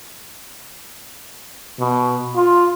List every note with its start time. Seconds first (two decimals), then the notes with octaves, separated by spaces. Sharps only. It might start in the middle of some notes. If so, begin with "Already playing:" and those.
1.79 B2
2.35 F4